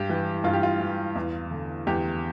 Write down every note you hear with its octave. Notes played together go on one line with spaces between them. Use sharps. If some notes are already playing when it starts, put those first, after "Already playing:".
Already playing: G2 G4
E3
G2 F4
G4
F4
E3
E2
D3
E2 G4